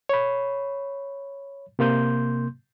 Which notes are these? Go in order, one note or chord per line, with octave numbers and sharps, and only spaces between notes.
C#5 B5
C3 A#3 C6 G6